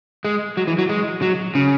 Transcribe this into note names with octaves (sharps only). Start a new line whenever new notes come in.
G#3
F#3
E3
F#3
G#3
F#3
C#3